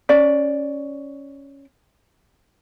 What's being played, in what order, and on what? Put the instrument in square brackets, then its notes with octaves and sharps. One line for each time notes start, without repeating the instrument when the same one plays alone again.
[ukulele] C#4 D5